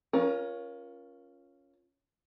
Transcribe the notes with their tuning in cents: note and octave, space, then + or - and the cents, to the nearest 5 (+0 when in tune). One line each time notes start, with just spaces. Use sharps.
C#4 +0 F4 +0 A#4 +25